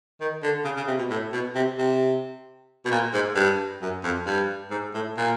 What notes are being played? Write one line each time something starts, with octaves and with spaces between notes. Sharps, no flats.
D#3
D3
C#3
C#3
C3
B2
A2
B2
C3
C3
B2
A#2
G#2
G2
F#2
F2
G2
G#2
A2
A#2